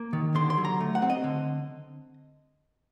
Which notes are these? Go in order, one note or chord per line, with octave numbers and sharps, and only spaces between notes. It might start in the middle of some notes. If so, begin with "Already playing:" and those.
Already playing: A#3
D#3
D3 C6
C6
F#3
A#5
A3
F#5
C4
D#5
D3